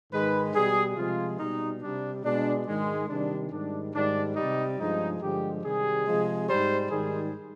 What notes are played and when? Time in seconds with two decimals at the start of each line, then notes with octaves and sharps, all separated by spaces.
0.12 G#2 D#3 G#3 B4
0.54 B2 G3 G#4
0.96 C3 F3 G#3 F4
1.39 B2 G3 D#4
1.81 C3 G3 D4
2.23 B2 G#3 D4
2.66 G#2 D#3 G#3
3.08 C3 D#3 G3 D4
3.51 G#2 D#3 G3 D4
3.93 G#2 D#3 G3 D4
4.36 G3 D#4
4.41 C3
4.79 G2 F3 G#3 D#4
5.21 G2 D3 F3 G#3 G4
5.63 C3 D#3 G3 G#4
6.05 C3 F3 G#3
6.48 G#2 G3 C5
6.90 G#2 D#3 G3 G#4